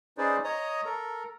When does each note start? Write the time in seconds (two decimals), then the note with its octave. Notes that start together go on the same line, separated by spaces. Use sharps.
0.18 C#4 D#4 G#4 B4 C5 D5
0.44 C#5 D#5 A#5 D#6
0.85 A4 A#4 A#5